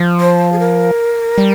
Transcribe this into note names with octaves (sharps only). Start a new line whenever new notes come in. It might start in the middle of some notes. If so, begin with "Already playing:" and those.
Already playing: F3
C5
G#4
A#4
G3